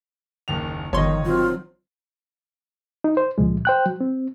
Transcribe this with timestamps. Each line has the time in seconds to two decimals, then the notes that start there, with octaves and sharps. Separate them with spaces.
0.48 F#1 D#2 F7
0.93 G1 D#3 F3 C#5 D#5 C6
1.25 D#3 F#3 C4 F4
3.04 D#4
3.17 C5
3.38 C#2 A#2 F3 G#3
3.65 C5 G5 F#6
3.86 F#3
4.01 C4